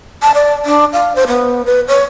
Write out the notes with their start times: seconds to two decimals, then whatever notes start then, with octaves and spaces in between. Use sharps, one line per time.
0.22 A5
0.35 D5
0.66 D4
0.93 F5
1.16 C5
1.28 B3
1.66 B4
1.88 C#5